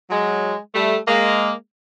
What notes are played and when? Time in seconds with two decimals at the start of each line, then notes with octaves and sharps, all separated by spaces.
0.11 F#3 G#3
0.75 G3 A3
1.08 G#3 A#3